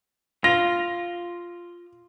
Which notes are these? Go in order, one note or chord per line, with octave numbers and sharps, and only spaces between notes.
F4 A#6